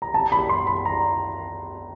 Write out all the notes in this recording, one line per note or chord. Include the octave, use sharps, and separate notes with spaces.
A#5
A5
B5
C6
B5
A#5